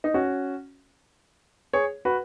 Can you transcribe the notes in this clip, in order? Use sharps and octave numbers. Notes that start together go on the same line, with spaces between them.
D#4
C#4 F#4
G#4 C#5
F#4 B4